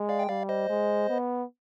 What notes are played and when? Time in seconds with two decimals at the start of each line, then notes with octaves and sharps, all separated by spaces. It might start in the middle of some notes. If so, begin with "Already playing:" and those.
Already playing: G#3
0.09 D5 F5
0.19 G5
0.29 G3 D5 F5
0.49 C5 D#5
0.69 G#3
1.09 B3